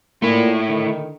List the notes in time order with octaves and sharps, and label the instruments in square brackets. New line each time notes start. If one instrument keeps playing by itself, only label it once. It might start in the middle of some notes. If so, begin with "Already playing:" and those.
[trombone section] A#2 [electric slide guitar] A3 E4
[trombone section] D3 D#3